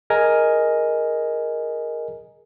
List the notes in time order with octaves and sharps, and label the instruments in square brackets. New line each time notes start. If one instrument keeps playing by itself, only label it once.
[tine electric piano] G#4 A#4 D#5 G#5